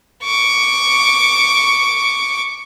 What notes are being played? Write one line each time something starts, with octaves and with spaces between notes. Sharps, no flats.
C#6 D6